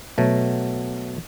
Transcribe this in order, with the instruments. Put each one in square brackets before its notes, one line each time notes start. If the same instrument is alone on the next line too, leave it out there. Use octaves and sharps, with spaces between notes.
[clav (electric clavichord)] B2 F#3 A3